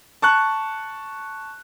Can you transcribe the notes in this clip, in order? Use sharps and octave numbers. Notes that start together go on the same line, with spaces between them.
A5 C#6 F#6